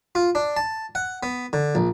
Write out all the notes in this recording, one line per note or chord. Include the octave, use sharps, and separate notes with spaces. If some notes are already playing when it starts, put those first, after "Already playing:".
F4
D4
A5
F#5
B3
D3
A#1